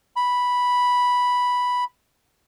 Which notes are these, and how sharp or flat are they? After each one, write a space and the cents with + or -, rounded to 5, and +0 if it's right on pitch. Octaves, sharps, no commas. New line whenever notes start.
B5 -5